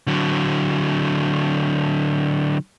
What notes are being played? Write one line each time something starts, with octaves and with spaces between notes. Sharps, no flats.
D3 F#3